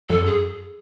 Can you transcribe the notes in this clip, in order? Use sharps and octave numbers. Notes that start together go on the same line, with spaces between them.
F2 A4
F#2
G#4